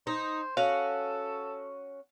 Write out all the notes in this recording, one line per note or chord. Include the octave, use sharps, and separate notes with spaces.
D#4 C5
C#4 F#4 A4 F5